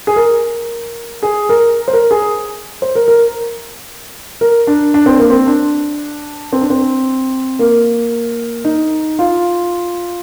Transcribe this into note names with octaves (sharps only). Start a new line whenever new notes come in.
G#4
A#4
G#4
A#4
C5
A#4
G#4
C5
A#4
A#4
A#4
D4
D4
C4
A#3
C4
D4
C4
D4
C4
A#3
D#4
F4